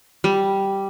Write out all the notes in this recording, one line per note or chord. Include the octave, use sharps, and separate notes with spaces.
G3